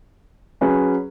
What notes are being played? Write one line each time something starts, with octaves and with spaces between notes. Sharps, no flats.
F#3 C#4 G#4 B4